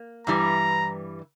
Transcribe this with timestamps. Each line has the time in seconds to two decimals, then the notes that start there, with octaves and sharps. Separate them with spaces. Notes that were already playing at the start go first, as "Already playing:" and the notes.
Already playing: A#3
0.27 G2 E3 G3 A#5